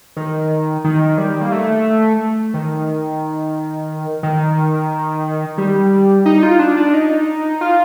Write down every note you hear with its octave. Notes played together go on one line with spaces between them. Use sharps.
D#3
D#3
G3
A#3
A3
D#3
D#3
G3
D#4
F4
D4
D4
D#4
F4